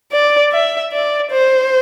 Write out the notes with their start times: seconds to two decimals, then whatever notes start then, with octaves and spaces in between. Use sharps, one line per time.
0.12 D5
0.52 E5
0.92 D5
1.32 C5